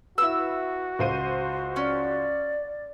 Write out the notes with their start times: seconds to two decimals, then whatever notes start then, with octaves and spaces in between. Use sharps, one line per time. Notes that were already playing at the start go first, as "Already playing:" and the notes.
0.18 E4 F#4 B4 E6
0.99 C#2 C5 D#7
1.76 C#4 D5